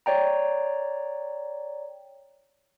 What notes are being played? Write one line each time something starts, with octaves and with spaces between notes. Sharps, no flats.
C#5 D5 G5 A#5